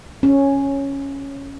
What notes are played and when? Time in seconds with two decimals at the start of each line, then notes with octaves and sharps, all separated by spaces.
0.23 C#4